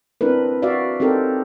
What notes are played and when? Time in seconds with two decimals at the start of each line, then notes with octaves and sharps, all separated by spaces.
0.21 C4 D4 E4 A#4 B4
0.62 F#4 D5 E5 F5
1.00 C4 D#4 G4 A4 A#4